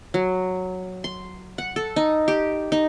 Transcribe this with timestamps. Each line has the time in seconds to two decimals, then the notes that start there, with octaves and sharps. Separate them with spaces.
0.14 F#3
1.04 C6
1.58 F#5
1.76 A4
1.96 D#4
2.28 G4
2.72 D#4